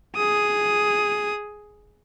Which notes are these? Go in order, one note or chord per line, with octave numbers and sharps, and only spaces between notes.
G#4 D#6